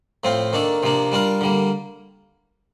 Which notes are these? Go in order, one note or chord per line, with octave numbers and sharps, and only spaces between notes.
A2 F3 C4 F4
D#3 A#3 D4 A4
C3 F3 A#3 D4
G3 D4 F4 A#4
D3 G3 A#3